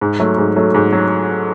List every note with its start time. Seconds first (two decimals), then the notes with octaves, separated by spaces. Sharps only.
0.01 G#2
0.20 F#3 A3
0.38 G#2
0.56 F#3 A3
0.74 G#2
0.92 F#3